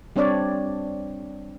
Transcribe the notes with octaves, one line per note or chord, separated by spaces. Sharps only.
G3 C4 D4 C#5 D5